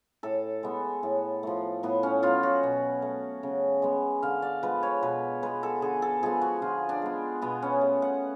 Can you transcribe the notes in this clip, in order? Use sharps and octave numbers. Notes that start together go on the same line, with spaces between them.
A2 A4
G#3 B3
A2
F3 A3
A2 B3
C#4
F#3 B3 F4
F#4
B2
A3
C#3
G#3 B3
D3 F5
D5
F3 G#3 B3 B4
C#5
B2 B4
G#3 B3 B4
A4
D3 G#4
A4
F3 G#3 B3 G#4
F#4
D3 F4
D4
G#3 B3
B2 B3
C#4
A3
F#5